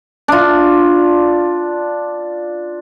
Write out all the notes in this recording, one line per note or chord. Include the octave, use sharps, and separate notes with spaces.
D4 F4